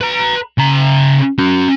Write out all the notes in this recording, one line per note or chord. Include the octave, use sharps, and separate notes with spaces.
B4 A#5
C#3 A#5
C#4 F#4